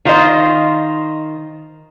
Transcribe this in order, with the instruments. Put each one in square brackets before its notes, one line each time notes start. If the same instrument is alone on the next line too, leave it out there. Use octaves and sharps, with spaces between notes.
[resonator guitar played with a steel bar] D#3 F4 C5 D#5